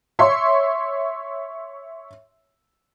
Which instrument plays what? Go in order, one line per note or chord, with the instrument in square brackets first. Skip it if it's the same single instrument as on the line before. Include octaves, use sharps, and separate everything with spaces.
[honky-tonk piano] C#5 E5 C6 C#6